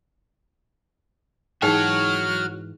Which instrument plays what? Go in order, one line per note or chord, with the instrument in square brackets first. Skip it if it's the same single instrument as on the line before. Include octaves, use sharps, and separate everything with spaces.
[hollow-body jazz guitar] G#2 E3 [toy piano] D#4 G#4 G5 [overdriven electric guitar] F#4 C#5 [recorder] F6